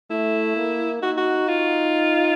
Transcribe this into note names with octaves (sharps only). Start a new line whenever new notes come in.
A3 E4
A#3
D#4 F#4
F#4
F4